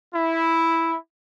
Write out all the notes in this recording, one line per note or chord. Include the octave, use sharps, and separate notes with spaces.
E4